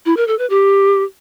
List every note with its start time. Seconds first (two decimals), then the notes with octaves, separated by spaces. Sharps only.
0.06 E4
0.17 A#4
0.28 A4
0.39 B4
0.50 G4